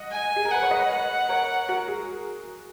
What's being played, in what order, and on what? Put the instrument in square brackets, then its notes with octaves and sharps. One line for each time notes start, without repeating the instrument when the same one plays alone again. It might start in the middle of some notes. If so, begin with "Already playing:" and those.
Already playing: [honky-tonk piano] D#5 F#5
[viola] G#5
[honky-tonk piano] G#4
A#4
[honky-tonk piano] B4 [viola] F#5
[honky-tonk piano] C#5
B4 D#5
[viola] F#5
[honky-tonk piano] A#4 C#5
F#4 A#4
G#4